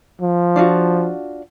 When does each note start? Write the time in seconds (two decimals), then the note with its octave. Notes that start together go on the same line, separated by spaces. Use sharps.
0.21 F3
0.56 D4 F4 F#4